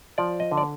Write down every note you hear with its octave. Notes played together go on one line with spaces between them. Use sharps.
F3 D5
D#5
D3
D5